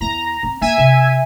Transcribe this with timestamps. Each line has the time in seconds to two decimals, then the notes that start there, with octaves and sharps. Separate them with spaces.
0.01 E2 A#5
0.43 C4
0.61 A#3 E5 G#5
0.78 C3